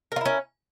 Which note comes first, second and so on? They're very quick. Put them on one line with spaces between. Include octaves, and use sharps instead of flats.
A#4 F4 E4 C#4